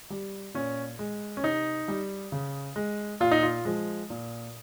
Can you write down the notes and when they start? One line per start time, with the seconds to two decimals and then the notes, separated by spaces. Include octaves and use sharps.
0.10 G3
0.54 A#2 C#4
0.99 G#3
1.37 C#4
1.43 C3 D#4
1.88 G3
2.32 C#3
2.76 G#3
3.20 A#2 F4
3.31 D#4
3.43 F4
3.65 F3 G#3
4.10 A#2